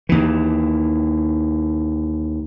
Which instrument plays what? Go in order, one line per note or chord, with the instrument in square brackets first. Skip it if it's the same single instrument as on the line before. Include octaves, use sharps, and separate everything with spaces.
[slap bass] D#2 E3